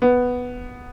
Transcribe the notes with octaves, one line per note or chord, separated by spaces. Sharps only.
B3